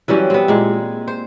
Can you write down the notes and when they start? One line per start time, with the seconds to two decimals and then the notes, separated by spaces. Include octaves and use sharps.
0.08 E3 F#3 G3 C#4
0.30 B3 C4
0.48 A#2 G#3
1.08 C5